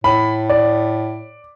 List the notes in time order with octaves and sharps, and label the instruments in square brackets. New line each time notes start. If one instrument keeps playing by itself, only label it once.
[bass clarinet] A2 [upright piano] B5
[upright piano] D5